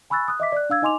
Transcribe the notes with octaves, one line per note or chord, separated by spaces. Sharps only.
G#5 B5 C#6 E6 F#6 A6
D#6 F#6
D#5 E5 D6 B6
D5 F#6
D4 F5 E6 G#6
D#4 D#5 G#5 C6 D6 F7